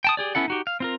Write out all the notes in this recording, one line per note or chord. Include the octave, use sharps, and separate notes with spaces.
G5 A5 D#6
G4 G#4 D5
B3 C#4 E4 A4 F#5
D#4 F#4 G4
F5
C4 F4 A#4